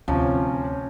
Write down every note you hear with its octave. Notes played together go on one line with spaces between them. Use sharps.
D2 C3 F3 C#4